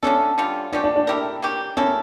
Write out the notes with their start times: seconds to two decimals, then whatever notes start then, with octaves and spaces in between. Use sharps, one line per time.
0.03 D3 A3 C#4 D4 A4
0.38 D3 G3 D4 F4
0.72 D3 F3 C#4 D4 G4
0.84 D4
0.96 D4
1.07 A3 E4 G4 A#4
1.42 A#3 C#4 G4
1.77 A#3 C#4 E4 A4